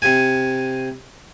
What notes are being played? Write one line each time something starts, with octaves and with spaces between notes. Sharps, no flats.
C3 G#5